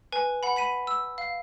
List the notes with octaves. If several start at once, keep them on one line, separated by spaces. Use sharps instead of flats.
B4 G#5
F#5 B5
B5 B6 D#7
E6
F5